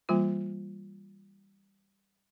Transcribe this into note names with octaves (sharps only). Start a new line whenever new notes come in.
E3 G3 A#3 F4